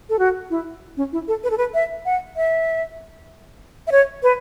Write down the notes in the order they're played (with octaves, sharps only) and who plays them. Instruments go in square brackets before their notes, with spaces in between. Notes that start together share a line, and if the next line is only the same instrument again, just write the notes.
[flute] A4
F#4
E4
C#4
E4
A4
B4
A4
B4
E5
F#5
E5
E5
C#5
B4